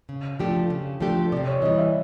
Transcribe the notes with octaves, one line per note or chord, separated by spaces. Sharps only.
C#3
F3 A3 D4 G4
C#3
F3 A3 D4 G4
C3 D5
C#5
E3 G3 D#5
E5